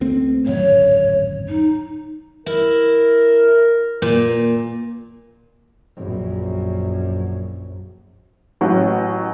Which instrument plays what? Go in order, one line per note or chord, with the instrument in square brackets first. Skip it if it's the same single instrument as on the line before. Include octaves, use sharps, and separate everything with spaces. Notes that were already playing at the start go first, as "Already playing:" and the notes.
[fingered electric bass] C#2 A3 C4
[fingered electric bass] D1 G#1 F#2 [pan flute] C#5
[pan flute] D#4
[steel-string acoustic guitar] E4 [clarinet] A#4
[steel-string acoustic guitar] A#2
[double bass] A#1 F#2
[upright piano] A1 F#3